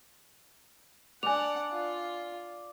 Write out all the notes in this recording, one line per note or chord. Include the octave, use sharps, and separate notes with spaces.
D4 D5 F#5 G#5 F7
F4